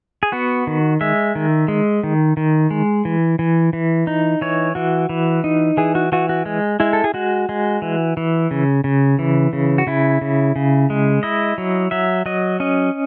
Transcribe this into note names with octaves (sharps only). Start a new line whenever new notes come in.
G#4
B3 F#4
D#3
G#3 E5
D#3
G#3
D#3
D#3
G#3
E3
E3
E3
D#4
E3 C#5
E3 F#4
E3
D#4
E3 G#4
F#4
E3 F#4
F#4
G#3
G#3 E4
A4
G#4
G#3 F#4
G#3
E3
E3
C#3
C#3
E3
C#3
F#4
C#3 E4
C#3
C#3
G#3
E4 D#5
F#3
F#3 E5
F#3 D#5
C#4 D#5